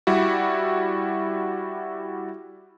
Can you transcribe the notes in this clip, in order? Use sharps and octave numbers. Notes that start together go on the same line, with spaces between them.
G3 E4 F#4